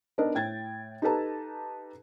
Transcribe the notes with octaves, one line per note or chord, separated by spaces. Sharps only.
B3 D4 D#4 A#4 D#5
A2 G5 G#6 A6
D#4 G4 A4 B4 A5 A#5